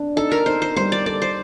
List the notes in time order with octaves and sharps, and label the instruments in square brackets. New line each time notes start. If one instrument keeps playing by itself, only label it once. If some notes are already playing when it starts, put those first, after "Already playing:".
Already playing: [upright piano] D4
[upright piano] D#4 [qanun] A4
[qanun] A#4
[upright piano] D#4 [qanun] C5
[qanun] C5
[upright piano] G3 [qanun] C5
[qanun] D5
[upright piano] A4 [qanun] D5
[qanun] C5